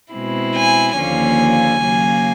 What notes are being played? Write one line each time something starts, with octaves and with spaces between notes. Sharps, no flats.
B2 G#3 C4 E4
G#5
D#2 D3 F3 A#3 C#4 G#5
C#3 F#3 A#3